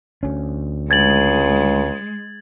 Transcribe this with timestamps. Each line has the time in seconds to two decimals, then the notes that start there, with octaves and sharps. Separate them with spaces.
0.23 D2 C#4
0.91 C#2 G#3 G#6 A6 F#7